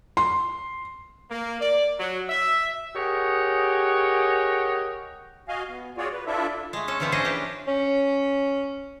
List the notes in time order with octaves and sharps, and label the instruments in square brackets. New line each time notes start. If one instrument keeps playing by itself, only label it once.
[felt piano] C6
[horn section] A#3
D5
F#3
E5
G4 G#4 A#4 C#5 D#5 F#5
[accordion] F#4 D#5 F5 G#5
B3
F4 F#4 G#4 C#5 D5
B4
D4 E4 F4 A4 E5
[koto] G#3 A3
C#4 A4
D3 E3 F3 B3 C4
C#4 D4 G#4 C5 D#5
E3 G4 B4
[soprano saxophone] C#4